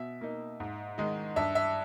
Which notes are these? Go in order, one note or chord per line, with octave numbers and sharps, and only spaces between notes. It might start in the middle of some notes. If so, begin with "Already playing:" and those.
Already playing: B2 E5
A#3 D#4
G#2
D#3 G#3 D#4
G2 E5
E5